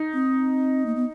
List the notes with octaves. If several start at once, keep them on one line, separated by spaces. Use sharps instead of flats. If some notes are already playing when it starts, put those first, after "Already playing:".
Already playing: D#4
C4
A#3
B3